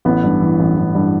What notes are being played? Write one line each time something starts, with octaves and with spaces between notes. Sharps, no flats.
A1 B3
G2
E3
A1
A1
G2